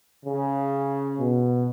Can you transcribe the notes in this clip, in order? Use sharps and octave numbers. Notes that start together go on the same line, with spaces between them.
C#3
B2